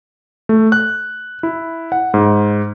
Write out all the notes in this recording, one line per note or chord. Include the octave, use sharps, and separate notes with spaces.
A3
F#6
E4
F#5
G#2